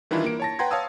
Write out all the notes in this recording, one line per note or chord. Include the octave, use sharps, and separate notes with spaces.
D#3 E3 G3 D4 E4 F4
A#3 D7
C#5 A5 A#6
B4 F#5 G5 A#5 C6 G#6
C#5 F5 A5 D#6 E6